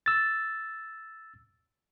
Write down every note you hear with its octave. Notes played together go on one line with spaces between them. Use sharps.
E6 A6